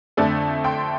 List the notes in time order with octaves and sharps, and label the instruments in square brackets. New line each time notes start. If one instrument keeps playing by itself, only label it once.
[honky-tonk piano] F2 D3 A3 A4 D5
G5 C6